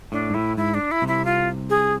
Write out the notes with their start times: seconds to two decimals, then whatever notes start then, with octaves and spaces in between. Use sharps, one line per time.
0.12 A2 D4
0.30 G#2
0.34 A2 E4
0.57 G#2 E4
0.74 D4
0.91 E4
1.02 C2 C3
1.08 E4
1.25 F4
1.70 G#4